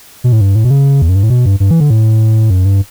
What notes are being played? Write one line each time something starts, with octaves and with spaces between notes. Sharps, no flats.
B2
A2
G2
A2
B2
C#3
E2
F#2
G2
A2
B2
G2
G2
E3
D3
A2
F#2
G2